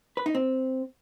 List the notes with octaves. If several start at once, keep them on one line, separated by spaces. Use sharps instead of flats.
B4
D#4
C4